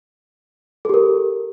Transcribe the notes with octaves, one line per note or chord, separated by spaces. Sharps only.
G4 A4 A#4